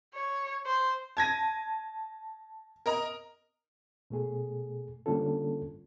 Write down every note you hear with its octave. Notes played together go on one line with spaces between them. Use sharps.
C#5
C5
A5 G#6 A#6 D#7
A#4 D#5 A#5
B2 A3 G#4
D3 G3 A#3 C#4 F4 A4